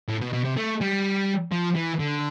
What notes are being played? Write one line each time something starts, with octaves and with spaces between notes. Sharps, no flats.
A2
B2
B2
C3
A3
G3
F3
E3
D3